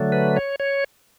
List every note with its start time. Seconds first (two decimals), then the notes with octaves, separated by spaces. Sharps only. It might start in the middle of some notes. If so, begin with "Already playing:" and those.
Already playing: D3 F#3 A3
0.12 B4
0.36 C#5
0.60 C#5